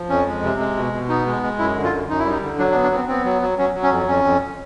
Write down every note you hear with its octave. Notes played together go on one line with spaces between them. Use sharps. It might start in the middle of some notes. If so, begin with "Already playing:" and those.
Already playing: F3
F2 C#4
G#3
C3
G#3
B2
B2
B3 D#4
G#3
G#3
F#2 E4
D3
F4
F#2
F#2 D#4
E4
G3 D#4
D3
F#3 D4
D4
B3
D4
B3 C4
B3 C4
F#3
F#3
F#3 C#4
F#3
C#4
F2
F2 C#4
F2